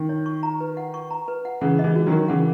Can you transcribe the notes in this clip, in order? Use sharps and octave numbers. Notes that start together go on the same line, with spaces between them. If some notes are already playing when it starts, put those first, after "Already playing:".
Already playing: D#3
C#5
C#6
A#5
B4
F#5
C#6
A#5
B4
F#5
C#3 E3 F#5
D#5
E3 G#3
F#4
D#3 F#3
A#4
C#3 E3 F#5